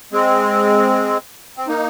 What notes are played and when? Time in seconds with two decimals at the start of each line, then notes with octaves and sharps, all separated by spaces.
0.12 G#3 C4
1.57 C4
1.68 A#3 D#4